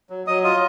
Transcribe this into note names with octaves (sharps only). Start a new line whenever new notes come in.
F#3
F#3 D#5 D#6
F4 D#5 D#6